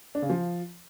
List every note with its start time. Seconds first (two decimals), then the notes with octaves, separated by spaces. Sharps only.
0.15 D4
0.22 C#3
0.30 F3